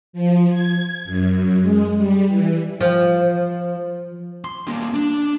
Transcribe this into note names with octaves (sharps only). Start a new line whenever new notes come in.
F3
G#6
F#2
G#3
G3
E3
F3
C6
G3 A#3
D4